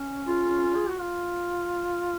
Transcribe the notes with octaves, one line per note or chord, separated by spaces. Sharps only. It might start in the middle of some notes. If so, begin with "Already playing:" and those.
Already playing: C#4
F4
G#4
F#4
F4